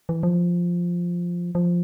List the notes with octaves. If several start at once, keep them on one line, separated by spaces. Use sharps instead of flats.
E3
F3
F3